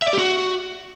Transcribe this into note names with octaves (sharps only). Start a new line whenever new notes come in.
E5
D5
G4
F#4